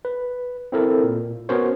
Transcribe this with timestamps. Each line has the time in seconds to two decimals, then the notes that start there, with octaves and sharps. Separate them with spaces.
0.05 B4
0.72 C4 E4 A4 A#4
1.04 A#2
1.49 B3 C#4 F#4 A#4 C5 C#5